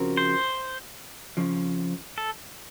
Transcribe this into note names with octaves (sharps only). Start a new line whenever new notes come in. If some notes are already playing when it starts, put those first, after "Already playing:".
Already playing: C#3 F3 C4 F#4 A#4
C5
F2 C#3 F3
A4